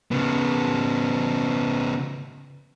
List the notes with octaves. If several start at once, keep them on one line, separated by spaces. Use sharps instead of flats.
C#3 B3